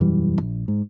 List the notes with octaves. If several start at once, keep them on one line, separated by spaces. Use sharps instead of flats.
E1 F#2 E3 G3
A#1
G#2